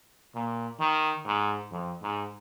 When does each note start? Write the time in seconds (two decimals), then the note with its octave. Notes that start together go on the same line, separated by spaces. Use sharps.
0.35 A#2
0.80 D#3
1.26 G#2
1.71 F2
2.02 G#2